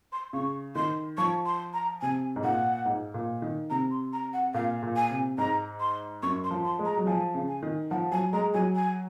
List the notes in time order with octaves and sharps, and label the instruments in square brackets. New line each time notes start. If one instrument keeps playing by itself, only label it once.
[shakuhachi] C6
[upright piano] C#3 [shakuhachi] C#6
[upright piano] D#3 [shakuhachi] C6
[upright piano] F3 [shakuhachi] C#6
[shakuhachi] C6
A#5
[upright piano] C3 [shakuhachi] G#5
[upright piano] G#2
[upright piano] A#2 [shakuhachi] F#5
[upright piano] G#2
A#2
D#3
[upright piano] C3 [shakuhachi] A#5
[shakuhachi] C6
A#5
F#5
[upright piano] A#2 [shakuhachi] F5
[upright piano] A#2
[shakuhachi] G#5
[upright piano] C3
[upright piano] G#2 [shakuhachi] A#5
[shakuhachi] C6
[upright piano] F#2 [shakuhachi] C#6
[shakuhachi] C6
[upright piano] F3
[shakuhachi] C6
[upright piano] G#3
[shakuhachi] A#5
[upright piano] F#3
[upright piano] F3 [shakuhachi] G#5
[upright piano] C#3
[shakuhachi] G#5
[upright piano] D#3
[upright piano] F3 [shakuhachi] F#5
[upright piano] F#3 [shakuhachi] G#5
[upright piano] G#3 [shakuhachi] A#5
[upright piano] F#3 [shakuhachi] G#5
[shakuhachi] G#5